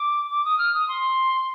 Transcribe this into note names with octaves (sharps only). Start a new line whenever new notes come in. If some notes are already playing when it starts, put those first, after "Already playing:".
Already playing: D6
D6
D#6
F6
D#6
C6